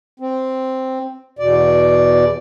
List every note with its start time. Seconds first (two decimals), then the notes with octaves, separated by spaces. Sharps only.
0.20 C4
1.39 E2 B2 D5